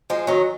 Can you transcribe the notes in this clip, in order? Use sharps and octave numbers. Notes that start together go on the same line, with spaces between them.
F3 G#3
D#3 F#3